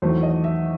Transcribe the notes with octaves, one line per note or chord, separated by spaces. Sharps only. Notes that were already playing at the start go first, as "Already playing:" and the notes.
E2 D#3 F#3 A3 C5
D#5
E5